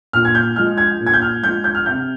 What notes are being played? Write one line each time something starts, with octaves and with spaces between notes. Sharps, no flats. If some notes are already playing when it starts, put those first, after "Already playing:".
A#2 F6
G#6
G6
F3 G#3 F6
G#6
A#2
G#6
G6
F6
F3 G#3 G6
G6
F6
C3 G6